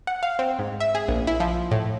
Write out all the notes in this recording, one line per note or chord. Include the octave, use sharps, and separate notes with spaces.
F#5
F5
C4
G#2
E5
G#4
A#1
E4
F3
A2